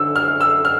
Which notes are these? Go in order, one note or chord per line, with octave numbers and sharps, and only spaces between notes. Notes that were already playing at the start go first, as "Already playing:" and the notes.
Already playing: D3 E6
F6
E6
F6